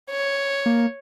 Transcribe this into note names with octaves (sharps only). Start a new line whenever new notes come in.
C#5
A#3